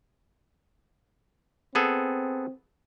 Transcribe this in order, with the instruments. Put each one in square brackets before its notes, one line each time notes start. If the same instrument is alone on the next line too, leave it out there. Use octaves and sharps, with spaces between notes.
[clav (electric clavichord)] B3 G#4 A4 [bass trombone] C4